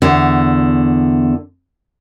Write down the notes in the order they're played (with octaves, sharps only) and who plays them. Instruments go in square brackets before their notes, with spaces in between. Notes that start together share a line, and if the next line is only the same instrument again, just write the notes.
[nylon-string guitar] E2 D3